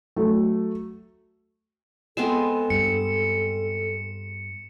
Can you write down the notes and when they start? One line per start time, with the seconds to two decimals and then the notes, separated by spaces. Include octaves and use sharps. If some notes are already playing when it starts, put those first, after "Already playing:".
0.16 F#3 A3
2.17 G#3 B3 C4 A4 E7
2.70 G2 C#7